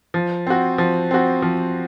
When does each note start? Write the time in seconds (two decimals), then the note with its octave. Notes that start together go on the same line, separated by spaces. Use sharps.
0.14 F3
0.47 C4 F#4
0.78 F3
1.11 C4 F#4
1.42 F3